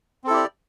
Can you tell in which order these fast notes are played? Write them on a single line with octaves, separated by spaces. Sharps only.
C4 A4 E4 G4 D5